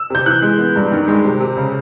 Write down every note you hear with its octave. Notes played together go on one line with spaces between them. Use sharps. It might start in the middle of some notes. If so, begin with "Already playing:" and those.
Already playing: E6
C3 G6
E3 F#6
G#3
B3
G2
D#3
G#3
C3
C3
C#3